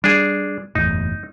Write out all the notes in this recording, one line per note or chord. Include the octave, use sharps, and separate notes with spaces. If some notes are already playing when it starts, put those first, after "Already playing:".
G3 D4 G#4
F#1 E2 A2 D#4